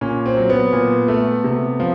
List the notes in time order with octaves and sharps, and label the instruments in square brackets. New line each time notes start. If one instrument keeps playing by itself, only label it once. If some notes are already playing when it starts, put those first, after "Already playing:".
[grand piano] A#2 C#4
C4
F#3
B3
A#2
A3
C3
F3